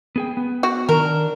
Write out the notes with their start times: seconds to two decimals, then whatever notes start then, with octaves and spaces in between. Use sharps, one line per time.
0.16 B3 G#4 G5
0.37 B3
0.63 F#4
0.89 D#3 D4 A#4